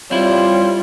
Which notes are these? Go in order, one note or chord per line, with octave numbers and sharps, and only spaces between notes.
G3 C4 E4 F4 C#5